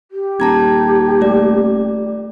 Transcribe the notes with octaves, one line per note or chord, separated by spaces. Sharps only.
G4
D#1 A5 A#5 G#6
A3 D5